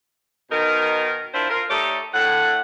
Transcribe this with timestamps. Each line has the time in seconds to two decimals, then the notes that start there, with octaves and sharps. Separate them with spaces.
0.51 B2 D#3 D#4 A#4
1.34 D4 E4 F4 A#4 C5
1.50 F4 A#4
1.70 A3 D#4 G4 A4 C#5 D5
2.14 A2 F#5